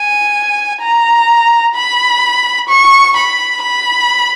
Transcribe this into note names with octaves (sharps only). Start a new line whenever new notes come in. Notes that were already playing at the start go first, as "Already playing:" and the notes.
Already playing: G#5
A#5
B5
C#6
B5
B5